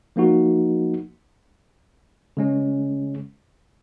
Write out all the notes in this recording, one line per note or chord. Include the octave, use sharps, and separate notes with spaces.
F3 A#3 D#4 F#4
C#3 G#3 C#4